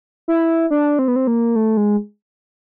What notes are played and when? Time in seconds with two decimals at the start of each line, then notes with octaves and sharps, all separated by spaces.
0.28 E4
0.71 D4
0.99 C4
1.08 B3
1.16 C4
1.27 A#3
1.56 A3
1.77 G#3